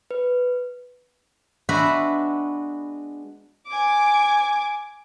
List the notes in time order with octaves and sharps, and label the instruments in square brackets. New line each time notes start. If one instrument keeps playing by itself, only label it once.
[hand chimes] B4
[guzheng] G#3 B3 D4 F#4 B4 E5
[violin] G#5 D6